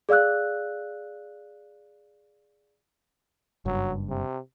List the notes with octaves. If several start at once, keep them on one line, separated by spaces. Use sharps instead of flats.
G#4 D5 F5 E6 F#6
F#1 G2 F#3
C3